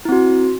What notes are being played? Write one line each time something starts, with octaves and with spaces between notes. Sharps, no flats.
C4 E4 F#4